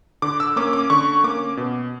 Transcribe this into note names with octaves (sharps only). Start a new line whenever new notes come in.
D3 D6
E6
A#3 C#4 D6
D6
D3 C#6
A#3 C#4 D6
B2